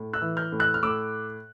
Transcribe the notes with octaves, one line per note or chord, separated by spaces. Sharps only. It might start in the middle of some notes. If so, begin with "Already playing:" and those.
Already playing: A2
E6 F#6
E3
F6 G6
A2
E6 F#6
F6
A2 D6 E6